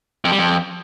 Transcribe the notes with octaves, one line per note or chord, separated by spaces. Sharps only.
F2
G3
F2